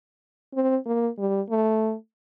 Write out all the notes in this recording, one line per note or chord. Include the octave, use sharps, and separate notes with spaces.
C4
A#3
G3
A3